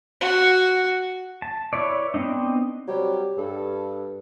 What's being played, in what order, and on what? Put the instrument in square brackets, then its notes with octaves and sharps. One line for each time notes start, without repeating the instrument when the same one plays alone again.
[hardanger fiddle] F#4
[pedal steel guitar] A5
E4 B4 C#5 D5
B3 C4 D4 D#4
[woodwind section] C3 F#3 G3 [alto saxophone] G4
[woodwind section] G2 [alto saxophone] A4